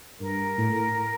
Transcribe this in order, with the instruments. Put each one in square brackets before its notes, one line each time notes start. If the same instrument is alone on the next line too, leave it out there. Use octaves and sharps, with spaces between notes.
[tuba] G2 [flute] A#4
[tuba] A2